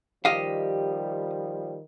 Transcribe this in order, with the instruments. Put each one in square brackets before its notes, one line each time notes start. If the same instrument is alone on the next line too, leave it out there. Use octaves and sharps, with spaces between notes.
[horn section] D#3 F3 G3 [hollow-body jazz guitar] G4 D#5 F5